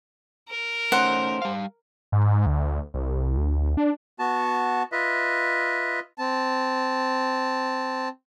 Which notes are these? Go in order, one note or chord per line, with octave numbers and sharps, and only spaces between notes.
A#4
A3 C#4 D#4 C5 F#5
G3 F5
G#2
D2
C2
D2
D4
B3 F#4 A5
F4 B4 D#5 E5
C4 A5